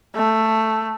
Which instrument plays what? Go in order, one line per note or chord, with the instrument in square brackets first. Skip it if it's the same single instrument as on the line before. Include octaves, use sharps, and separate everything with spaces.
[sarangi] A3